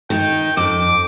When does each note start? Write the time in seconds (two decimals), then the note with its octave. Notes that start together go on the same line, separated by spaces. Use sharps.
0.10 D#3 D#4 G5
0.57 F2 D6